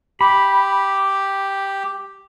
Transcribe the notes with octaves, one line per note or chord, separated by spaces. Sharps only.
G4 B5